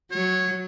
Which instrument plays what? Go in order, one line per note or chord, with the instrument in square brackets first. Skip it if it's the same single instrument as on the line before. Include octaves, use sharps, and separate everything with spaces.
[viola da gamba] F#3 [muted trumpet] C#5